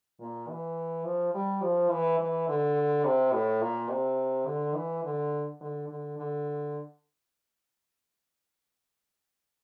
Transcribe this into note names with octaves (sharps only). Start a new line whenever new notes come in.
A#2
E3
F3
G3
F3
E3
E3
D3
C3
A2
A#2
C3
D3
E3
D3
D3
D3
D3